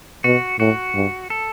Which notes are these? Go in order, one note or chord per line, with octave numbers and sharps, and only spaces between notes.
B2 F#4
A2 F#4
G2
A4